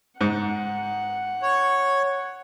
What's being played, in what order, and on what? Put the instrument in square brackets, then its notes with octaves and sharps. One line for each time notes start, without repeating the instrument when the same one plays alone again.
[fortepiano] G#2 [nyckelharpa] F#5
[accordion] C#5